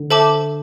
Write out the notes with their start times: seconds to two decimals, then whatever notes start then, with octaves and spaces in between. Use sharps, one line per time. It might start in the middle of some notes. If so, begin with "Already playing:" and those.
Already playing: D3
0.10 A4 C5 E5 A5 D6